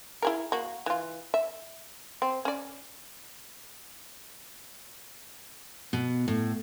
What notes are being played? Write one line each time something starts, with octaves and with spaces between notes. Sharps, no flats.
E4 G#4 A#4
A#3 F#4
E3 F4
E5
C4
C#4 D5
B2
A2